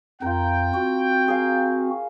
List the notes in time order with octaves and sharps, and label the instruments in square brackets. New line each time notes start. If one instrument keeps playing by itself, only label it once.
[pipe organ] F2 [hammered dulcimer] F4 A#4 [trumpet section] G5
[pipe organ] C4 F#4
[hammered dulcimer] G#4 A#4 F5